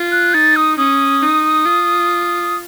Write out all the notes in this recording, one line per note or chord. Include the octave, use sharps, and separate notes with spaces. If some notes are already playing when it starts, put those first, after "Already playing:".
Already playing: F4
F#6
D#4 A6
D#6
C#4 D#6
D#4
F4